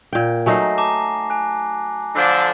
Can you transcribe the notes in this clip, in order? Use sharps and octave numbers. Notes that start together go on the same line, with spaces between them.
A#2 G5
F#3 A3 D#4 G#5 A#6 C7
A5 A#5 D6
G#5 F#6
D3 F3 D4